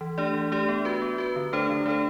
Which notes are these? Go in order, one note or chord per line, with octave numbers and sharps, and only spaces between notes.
E3
A3 D4 G4 D5
E3
A3 D4 G4 D5
B3
F#4 B4
B3
F#4 B4
D3
A3 D4 A4 C5
D3
A3 D4 A4 C5